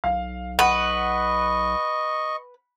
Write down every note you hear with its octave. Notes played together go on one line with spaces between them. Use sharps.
B1 F5
B4 D#5 F#5 C#6